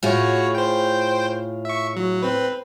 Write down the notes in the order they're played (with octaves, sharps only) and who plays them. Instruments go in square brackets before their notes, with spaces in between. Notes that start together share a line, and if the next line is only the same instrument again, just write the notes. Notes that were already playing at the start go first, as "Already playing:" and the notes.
[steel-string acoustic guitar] A2 F4 G#4 [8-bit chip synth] F#4 C#5
[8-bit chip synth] C5 G5
E5 C#6
F#3
C4 B4